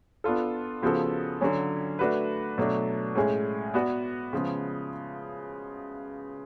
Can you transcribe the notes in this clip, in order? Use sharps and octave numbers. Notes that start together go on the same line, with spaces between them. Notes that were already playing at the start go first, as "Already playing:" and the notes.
B3 D4 F4 A4
C#3 F3 B3 F#4 A4
D3 F#3 C#4
A3 D4 F#4 B4
B2 F#3 A3 D4
A2 G#3 C#4 G#4
B3 F#4 B4 D5
C#3 F3 G#3 B3